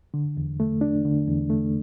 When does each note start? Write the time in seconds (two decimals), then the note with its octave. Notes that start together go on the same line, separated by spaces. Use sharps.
0.14 D3
0.37 E2
0.60 A3
0.81 D4
1.05 D3
1.28 E2
1.50 A3